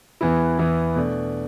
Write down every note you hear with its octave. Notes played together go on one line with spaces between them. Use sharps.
E2 E3 B3 E4
E2 E3 B3 E4
B2 A3 D4